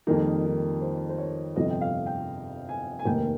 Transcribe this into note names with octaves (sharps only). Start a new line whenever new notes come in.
F2 D#3 G3 A#3 D#4
D#4
C5
C5
C#5
G1 F2 C3 F3 D#5
G5
F5
G5
G#5
G#5
F1 D#2 D#3 A#3 G5